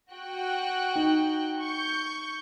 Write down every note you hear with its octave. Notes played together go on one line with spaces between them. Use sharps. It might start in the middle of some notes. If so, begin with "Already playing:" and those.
F#4 G5 F#6
D#4
C#6 G6